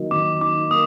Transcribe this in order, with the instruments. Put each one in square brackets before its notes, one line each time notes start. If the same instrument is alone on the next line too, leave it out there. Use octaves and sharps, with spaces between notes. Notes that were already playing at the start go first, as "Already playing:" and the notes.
Already playing: [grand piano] D#3 F#3 A#3 D#4
[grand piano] D#3 [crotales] D6
[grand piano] D#4 [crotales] D6
[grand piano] A#3 [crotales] D#6